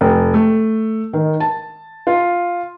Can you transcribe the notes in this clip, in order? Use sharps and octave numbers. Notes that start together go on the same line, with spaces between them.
F1
A3
D#3
A5
F4